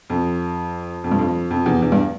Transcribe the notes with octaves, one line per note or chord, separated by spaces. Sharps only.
F2
F2
G2
F2
F2
E2
E2
G2